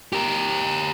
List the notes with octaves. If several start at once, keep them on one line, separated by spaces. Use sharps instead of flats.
G4 A#4